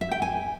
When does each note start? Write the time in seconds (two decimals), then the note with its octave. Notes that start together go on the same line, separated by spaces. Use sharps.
0.01 E5
0.11 G5
0.22 G#5